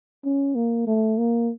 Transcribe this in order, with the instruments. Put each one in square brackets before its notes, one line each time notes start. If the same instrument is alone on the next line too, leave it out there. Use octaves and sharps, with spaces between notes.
[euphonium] C#4
A#3
A3
A#3